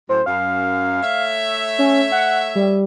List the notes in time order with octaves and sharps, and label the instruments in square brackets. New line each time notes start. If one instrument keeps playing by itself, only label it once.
[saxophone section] F#2 A2 [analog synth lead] C5
[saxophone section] F#2 [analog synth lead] F5
[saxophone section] A3 C#5 E5
[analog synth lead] C#4
F#5
G3